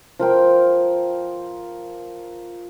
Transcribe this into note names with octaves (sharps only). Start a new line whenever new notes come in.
F3 A#4 G5